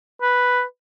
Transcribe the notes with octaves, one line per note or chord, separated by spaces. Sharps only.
B4